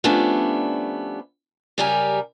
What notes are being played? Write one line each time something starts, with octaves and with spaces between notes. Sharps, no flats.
F3 G3 A3 B3 C#4 D4
F#2 C#3 G3 G4 A#4 G#5